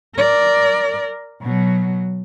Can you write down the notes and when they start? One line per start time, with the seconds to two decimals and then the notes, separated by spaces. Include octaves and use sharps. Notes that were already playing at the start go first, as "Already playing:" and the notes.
0.16 A#4 D5
1.42 B2 F#3